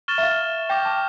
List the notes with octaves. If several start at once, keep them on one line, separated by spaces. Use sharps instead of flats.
C#6 F6 A6 E7 G7
E5
F5
G5 D6 G6 A#6
A5